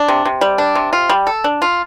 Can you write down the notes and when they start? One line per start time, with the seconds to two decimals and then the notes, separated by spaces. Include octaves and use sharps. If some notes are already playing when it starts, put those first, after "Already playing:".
Already playing: D4
0.08 C3
0.25 C3
0.41 G3
0.58 D4
0.75 C3
0.93 F4
1.10 G3
1.27 A4
1.44 D4
1.62 F4